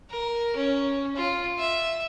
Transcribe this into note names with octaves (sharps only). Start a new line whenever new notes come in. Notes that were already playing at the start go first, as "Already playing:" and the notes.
A#4
C#4
F4
E5